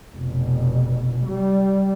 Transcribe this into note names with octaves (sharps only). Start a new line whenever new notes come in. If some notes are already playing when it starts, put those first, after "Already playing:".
F1 B2
G3